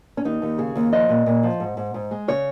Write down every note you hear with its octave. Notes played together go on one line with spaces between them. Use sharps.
C#4
D#2 D#4
D#2
C#3 G#4
D#2
F3 D#5
A#2
A#2
F3
G#2
G#2
G#2
G#3
C#3 C#5